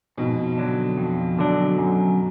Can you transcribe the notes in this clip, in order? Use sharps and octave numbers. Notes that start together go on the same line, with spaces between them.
F2 G#2 B2
D3 F#3 D4
F2
D3 F#3 D4
F#2